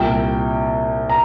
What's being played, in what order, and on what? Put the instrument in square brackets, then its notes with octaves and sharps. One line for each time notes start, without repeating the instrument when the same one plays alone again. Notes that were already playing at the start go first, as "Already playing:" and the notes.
Already playing: [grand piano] C2 A#2 G3 G5
A#5